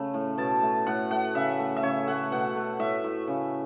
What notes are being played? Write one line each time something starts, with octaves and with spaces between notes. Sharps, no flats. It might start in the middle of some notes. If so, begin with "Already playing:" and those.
Already playing: C#3 A3
A2
B2 A5
A3
A2 F#5
A3 F#5
C#3 E5
A3
E5
C#3 C#5
A3 F#5
B2 F#5
A3
A2 E5
A2
C#3